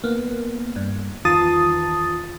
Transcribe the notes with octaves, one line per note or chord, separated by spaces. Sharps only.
A#3 B3
G2
E2 D#3 F4 A5 D#6 A6